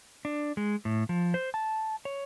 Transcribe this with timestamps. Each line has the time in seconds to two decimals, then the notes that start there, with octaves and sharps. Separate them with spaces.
0.25 D4
0.57 G#3
0.85 A2
1.09 F3
1.34 C5
1.54 A5
2.05 C#5